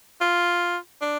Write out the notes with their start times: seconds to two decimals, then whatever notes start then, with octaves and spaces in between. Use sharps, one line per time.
0.21 F4
1.01 D4